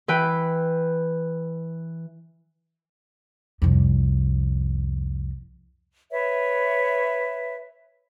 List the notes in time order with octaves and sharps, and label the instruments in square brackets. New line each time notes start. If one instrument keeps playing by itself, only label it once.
[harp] E3 B4 G5
[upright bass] C2 F2
[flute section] B4 C#5 E5